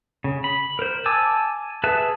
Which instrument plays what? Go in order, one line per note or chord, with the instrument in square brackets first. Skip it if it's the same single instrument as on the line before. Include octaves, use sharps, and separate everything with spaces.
[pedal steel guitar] C#3
B5
A#4 C5
G#5 A5 D6 E6
G#4 B4 E5 A5